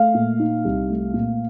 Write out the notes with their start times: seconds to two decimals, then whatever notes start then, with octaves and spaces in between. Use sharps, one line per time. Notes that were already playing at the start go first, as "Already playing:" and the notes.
Already playing: A3 F5
0.14 A#2
0.39 D#4
0.65 C2
0.90 A3
1.14 A#2